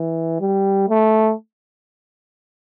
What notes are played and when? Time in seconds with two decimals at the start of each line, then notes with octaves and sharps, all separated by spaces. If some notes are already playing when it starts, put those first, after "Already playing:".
Already playing: E3
0.41 G3
0.89 A3